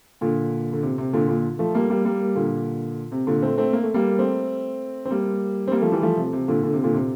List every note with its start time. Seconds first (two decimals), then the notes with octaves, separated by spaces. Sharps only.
0.21 A#2 D3
0.73 D3
0.83 C3
0.98 C3
1.13 A#2 D3
1.28 A#2 D3
1.59 F3 A3
1.75 G3 A#3
1.90 G3 A#3
2.05 G3 A#3
2.35 A#2 D3
3.12 C3
3.27 A#2 D3
3.42 A3 C4
3.58 A3 C4
3.73 A#3
3.83 A3
3.94 G3 A#3
4.19 A3 C4
5.05 C4
5.11 G3 A#3
5.67 C4
5.72 G3 A#3
5.81 F3 A3
5.92 E3 G3
6.02 F3 A3
6.17 C3
6.33 C3
6.48 A#2 D3
6.63 A#2 D3
6.73 C3
6.84 A#2 D3
6.94 C3